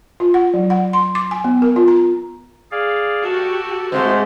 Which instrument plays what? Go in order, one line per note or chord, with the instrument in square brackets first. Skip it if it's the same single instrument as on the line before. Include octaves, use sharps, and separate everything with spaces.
[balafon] F4
F#5
F#3
F#5
C6
D6
G#5
B3
A#4
F4
A#5
[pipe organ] G#4 D5 F5
[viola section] F#4 G4 [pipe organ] A4 A5
[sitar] G#2 C3 A3 [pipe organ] G#3 [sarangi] C5